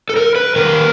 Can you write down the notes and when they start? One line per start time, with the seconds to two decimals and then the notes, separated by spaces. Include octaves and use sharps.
0.10 A4
0.16 A#4
0.36 B4
0.56 D#3 G3 A#3 A#4